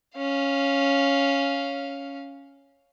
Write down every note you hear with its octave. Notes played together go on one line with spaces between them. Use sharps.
C#4 F5